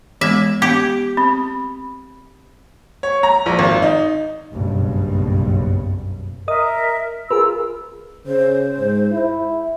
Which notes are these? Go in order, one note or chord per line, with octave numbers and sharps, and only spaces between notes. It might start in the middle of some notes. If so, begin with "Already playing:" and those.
E3 G#3 B3 E5
B3 G4
C4 B5 D#6
C#5
A#5
A#1
G#1
D#4
F#1 B1 G2 B2
A#4 D#5 E5 D#6
F4 G#4 A#4 B4 E6
C#3 C5
G#2
E4